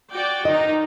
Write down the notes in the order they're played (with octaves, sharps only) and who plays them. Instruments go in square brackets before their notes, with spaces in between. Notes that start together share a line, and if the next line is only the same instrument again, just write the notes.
[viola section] F#4 D5 G5
[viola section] D#3 D#4 [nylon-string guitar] D#5